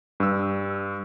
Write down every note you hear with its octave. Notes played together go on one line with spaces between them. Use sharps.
G2 E6